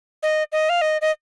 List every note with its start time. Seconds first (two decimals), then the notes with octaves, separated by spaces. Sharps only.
0.23 D#5
0.52 D#5
0.69 F5
0.81 D#5
1.01 D#5